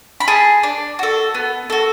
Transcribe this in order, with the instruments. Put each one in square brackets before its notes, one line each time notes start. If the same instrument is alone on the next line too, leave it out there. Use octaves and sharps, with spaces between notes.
[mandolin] B5
G#4 A5
D4
F#4 A4
B3
F#4 A4